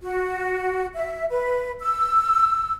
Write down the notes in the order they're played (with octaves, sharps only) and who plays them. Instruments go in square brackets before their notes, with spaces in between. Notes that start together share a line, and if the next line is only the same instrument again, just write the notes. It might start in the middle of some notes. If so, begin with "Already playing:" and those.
[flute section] F#4
E5
B4
E6